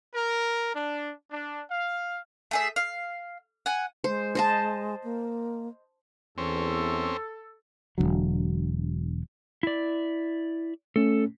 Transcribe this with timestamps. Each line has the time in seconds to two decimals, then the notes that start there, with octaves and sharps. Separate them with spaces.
0.15 A#4
0.75 D4
1.31 D4
1.70 F5
2.51 A3 G#4 E5
2.76 F5
3.66 F#5 G#5
4.04 G#3 C5
4.35 C5 D#5 A5
5.04 A#3
6.38 E2 C4 C#4 A4
7.98 E1 B1 D3 F#3
9.63 E4 D5
10.96 A3 C#4 A4